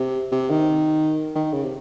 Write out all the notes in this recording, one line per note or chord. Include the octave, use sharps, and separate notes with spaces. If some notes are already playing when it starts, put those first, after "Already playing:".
Already playing: C3
C3
D#3
D#3
C#3
C3